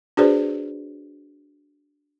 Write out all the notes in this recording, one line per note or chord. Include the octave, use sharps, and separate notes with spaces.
D4 F#4 G#4 B4 C5 D5